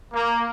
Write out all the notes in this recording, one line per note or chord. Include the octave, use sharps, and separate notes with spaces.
A#3